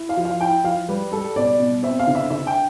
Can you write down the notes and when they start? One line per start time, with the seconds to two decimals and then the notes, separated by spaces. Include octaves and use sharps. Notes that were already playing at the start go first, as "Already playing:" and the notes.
Already playing: E4
0.09 F5
0.17 F3
0.25 F5
0.40 E4 G5
0.64 F3 F5
0.88 G3 B4
1.12 G3 A4
1.36 B2 D5
1.60 B2
1.82 C4 E5
1.99 F5
2.07 D3
2.15 E5
2.30 D3 E5
2.47 G5